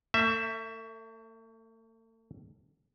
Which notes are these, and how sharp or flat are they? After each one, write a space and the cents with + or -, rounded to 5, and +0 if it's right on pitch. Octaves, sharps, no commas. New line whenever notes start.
A3 +40 E5 +0